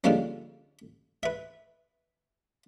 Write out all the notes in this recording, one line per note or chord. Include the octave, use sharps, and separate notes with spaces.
D3 F3 G3 G#3 A#3 C#4
B4 E5